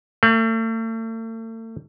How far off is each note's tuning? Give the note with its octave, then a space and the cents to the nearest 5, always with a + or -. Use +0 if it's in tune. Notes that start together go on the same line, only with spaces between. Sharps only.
A3 +40